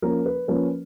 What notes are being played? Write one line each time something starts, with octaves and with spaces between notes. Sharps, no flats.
F3 A#3 C#4 A#4
B4
F3 A#3 C#4 B4